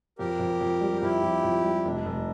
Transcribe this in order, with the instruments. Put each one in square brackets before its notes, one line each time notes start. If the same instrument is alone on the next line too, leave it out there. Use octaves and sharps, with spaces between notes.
[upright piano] F2 [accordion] G4 A#4
[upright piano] F2
F2
G3
[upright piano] F2 [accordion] E4 G4
[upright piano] F2
F2
G3
[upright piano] F1 [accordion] D4
[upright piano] F1